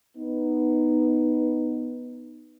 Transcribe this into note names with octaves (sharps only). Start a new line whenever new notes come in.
B3 D#4